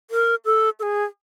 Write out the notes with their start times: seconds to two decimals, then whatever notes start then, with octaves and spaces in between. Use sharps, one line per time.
0.11 A#4
0.45 A4
0.79 A4
0.83 G#4